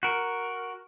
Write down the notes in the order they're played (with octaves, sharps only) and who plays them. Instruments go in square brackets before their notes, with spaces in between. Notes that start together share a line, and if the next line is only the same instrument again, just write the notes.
[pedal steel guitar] F#4 A#4